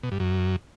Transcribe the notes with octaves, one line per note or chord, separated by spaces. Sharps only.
B2
G2
F#2